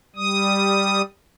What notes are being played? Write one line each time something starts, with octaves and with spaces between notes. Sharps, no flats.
G3 D#6